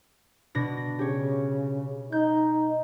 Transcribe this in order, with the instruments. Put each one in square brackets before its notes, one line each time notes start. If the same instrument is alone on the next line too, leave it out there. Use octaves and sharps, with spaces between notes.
[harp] B2 D4 A#6
[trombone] C#3 [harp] G4 C#5
[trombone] D#4 [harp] G6